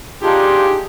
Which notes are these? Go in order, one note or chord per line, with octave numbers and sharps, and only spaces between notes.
D4 D#4 F4 G4 G#4